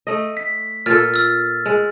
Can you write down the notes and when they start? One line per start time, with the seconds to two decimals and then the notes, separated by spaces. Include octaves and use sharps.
0.07 A3 D#5
0.37 B6
0.86 A#2 F4 A4 F6 A6
1.14 E6 F6
1.66 G#3